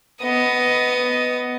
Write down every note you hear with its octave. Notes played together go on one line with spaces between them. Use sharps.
B3 D#5